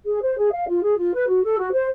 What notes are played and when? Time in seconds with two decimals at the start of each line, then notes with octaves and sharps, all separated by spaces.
0.06 G#4
0.22 C5
0.37 G#4
0.52 F5
0.67 F4
0.82 G#4
0.97 F4
1.13 B4
1.27 F#4
1.44 A4
1.58 F#4
1.73 C5